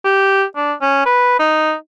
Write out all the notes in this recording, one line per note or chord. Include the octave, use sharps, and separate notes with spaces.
G4
D4
C#4
B4
D#4